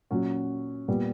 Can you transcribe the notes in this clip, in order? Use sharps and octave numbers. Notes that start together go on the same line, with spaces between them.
A#2 F#3 C#4 F#4
A#2 G3 B3